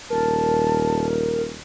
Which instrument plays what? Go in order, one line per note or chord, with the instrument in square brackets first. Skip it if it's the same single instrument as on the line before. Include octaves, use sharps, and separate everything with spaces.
[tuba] D#1 [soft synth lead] A#4 [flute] A5